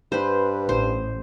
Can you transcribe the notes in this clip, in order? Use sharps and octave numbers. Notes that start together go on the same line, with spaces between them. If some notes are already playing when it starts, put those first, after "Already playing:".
G2 B4 C5
A1 C5